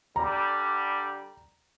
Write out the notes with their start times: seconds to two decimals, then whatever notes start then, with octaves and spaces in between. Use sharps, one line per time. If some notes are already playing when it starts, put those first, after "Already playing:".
0.16 D3 G3 A#5